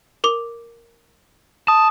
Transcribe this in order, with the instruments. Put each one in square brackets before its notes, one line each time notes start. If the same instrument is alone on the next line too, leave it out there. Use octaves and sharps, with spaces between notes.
[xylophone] A#4 D6
[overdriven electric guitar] A5 [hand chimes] D#6